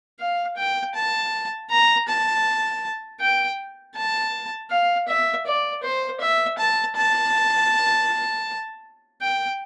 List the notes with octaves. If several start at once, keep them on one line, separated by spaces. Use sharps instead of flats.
F5
G5
A5
A#5
A5
G5
A5
F5
E5
D5
C5
E5
A5
A5
G5